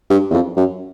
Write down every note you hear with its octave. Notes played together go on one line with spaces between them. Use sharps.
G2
E2
F2
F#2